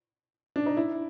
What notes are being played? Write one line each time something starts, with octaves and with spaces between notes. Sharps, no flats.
D4
D#4
E4